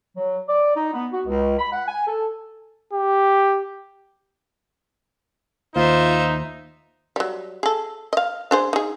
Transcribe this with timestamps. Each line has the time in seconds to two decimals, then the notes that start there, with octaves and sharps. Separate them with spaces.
0.17 F#3
0.48 D5
0.76 D#4
0.94 B3
1.13 F#4
1.26 C#2
1.58 B5
1.73 F#5
1.88 G#5
2.08 A4
2.93 G4
5.76 D#2 D#4 F4 C5 E5
7.16 F#3 G3
7.63 G#4 A4
8.13 D#5 F5
8.51 D4 G#4 C5
8.73 D#4 G#4